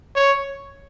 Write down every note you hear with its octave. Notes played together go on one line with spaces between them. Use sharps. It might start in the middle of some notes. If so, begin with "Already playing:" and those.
C#5